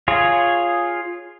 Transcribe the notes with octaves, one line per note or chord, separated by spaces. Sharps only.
F4 G#4 C#5